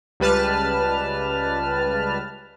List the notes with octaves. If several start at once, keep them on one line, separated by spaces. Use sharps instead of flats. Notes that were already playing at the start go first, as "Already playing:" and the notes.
C#2 G3 B4 A5 F6